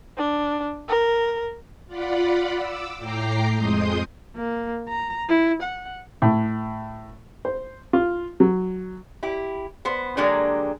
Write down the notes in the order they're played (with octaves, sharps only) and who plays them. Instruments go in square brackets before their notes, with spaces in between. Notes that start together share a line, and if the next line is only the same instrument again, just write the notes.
[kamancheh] D4
A#4
[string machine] F4 D5 F#5 B5
D6 E6
A2 G5 A#5 D6 C7
F2 G#3 C6 D#6 G6
[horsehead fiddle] A#3
A#5
E4
F#5
[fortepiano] A2
C5
F4
F#3
[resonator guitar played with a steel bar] E4 G4
B3 C5
D3 F#3 G#3 A#3 D4 G4